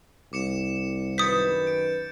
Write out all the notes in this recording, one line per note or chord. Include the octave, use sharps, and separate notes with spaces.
C2 D6 C#7 E7
F#2 D#3 B4 D#6 G6 A6 B6 C#7
D7